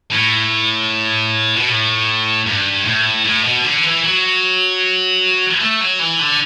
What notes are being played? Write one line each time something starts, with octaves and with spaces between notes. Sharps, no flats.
A2
B2
A2
G2
A2
A2
B2
D3
E3
F#3
A3
F#3
E3
D3